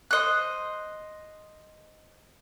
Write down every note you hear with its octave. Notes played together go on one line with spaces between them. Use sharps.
C5 D#5 F#6